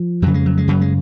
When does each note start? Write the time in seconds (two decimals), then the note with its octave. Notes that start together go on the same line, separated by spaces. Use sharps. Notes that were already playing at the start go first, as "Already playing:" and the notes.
Already playing: F3
0.22 F2 C#3 F#3
0.34 G#3
0.46 F#3
0.57 G#3
0.68 F#2 C#3 F#3
0.81 G#3